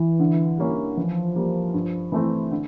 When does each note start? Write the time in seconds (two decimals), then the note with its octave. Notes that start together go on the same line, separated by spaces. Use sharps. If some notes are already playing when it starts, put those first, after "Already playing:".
Already playing: E3
0.19 D3
0.58 G3 A#3 C#4 E4
0.97 E3 F3
1.35 G3 A#3
1.74 G2
2.12 E3 A3 C4 E4
2.51 D3